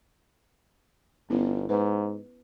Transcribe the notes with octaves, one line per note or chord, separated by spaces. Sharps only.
G1 B3 C#4 E4
G#2 B4